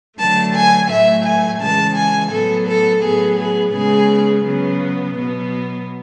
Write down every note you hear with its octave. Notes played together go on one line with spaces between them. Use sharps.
D3 F#3 A3 A5
G#5
A2 F#3 A3 E5
G#5
C#3 E3 G#3 A5
G#5
A2 F#3 B3 A4
A4
A2 F#3 B3 G#4
G#4
C#3 G#3 B3 G#4
C#3 F#3 B3
B2 F#3 B3